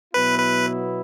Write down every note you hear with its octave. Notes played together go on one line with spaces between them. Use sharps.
B2 F#3 B3 E4 B4
B4